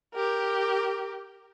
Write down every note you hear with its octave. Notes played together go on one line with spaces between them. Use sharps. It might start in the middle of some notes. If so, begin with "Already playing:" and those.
G4 A#4